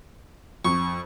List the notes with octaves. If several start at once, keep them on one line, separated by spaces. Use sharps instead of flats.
F2 C#6